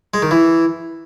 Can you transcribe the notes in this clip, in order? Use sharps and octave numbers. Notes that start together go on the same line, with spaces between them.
G#3
D#3
E3